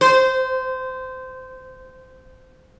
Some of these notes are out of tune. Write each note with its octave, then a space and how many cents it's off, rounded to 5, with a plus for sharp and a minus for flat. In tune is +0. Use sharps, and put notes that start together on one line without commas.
C5 -20